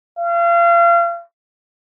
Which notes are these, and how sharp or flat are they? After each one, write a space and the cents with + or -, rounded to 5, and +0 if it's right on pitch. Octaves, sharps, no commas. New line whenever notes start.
F5 -35